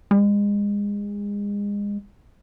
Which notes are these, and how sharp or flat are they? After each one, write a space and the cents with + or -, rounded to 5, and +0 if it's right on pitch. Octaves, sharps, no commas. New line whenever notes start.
G#3 -30